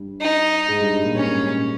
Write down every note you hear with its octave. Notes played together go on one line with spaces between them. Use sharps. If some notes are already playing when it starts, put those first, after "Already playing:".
Already playing: G2 G3
D#4
G#2 G#3
G2 G3
G2 G3
A#2 A#3
G#2 G#3 C#4
G#2 G#3
A#2 A#3